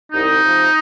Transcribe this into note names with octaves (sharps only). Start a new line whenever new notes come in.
C2 D#4
C3 F3